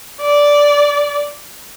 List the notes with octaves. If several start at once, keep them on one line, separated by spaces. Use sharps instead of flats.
D5